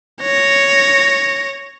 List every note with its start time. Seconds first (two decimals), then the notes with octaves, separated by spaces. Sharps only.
0.22 C#5 A#6